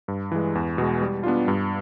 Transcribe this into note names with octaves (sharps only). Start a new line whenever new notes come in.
G2
E3 G#3
E2
B2 G#3
G3
B3 D4 F4
G2